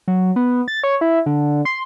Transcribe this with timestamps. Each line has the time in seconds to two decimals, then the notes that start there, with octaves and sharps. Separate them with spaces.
0.08 F#3
0.36 B3
0.68 A6
0.83 C#5
1.01 E4
1.26 D3
1.65 C6